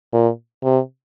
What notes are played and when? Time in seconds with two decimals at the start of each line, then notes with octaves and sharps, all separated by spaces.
0.13 A#2
0.63 C3